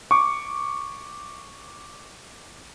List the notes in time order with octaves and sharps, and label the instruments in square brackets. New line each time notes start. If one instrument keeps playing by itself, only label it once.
[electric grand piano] C#6 D6